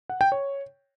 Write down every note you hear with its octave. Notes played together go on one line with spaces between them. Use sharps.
F#5
G5
C#5